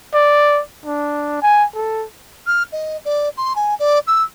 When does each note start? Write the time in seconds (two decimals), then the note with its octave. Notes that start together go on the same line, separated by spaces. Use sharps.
0.14 D5
0.86 D4
1.42 G#5
1.74 A4
2.46 F6
2.72 D#5
3.04 D5
3.37 C6
3.55 G#5
3.79 D5
4.07 E6